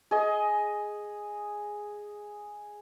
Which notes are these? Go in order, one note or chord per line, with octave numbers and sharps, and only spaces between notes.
G#4 D#5